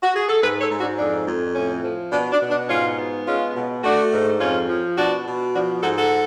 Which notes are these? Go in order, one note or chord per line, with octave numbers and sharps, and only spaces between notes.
F#4
G#4
A4
G#2 G#4 B4
A4 C#5
G#2
D4 F#4
F2 D4
F2
A2 C#4
F3
B2 D4
D4
B2
D4
G#2 C#4 F4
B3
G#3 C#4 F4
B2
A3 D4 F#4
G#2
F2 C#4 F4
F3
B2 D4 F#4
B2
F3 D4 F#4
G#2 F#4 A4
F#4 A4